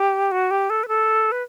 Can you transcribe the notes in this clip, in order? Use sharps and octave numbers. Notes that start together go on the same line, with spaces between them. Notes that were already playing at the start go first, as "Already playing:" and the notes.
Already playing: G4
F#4
G4
A4
B4
A4
B4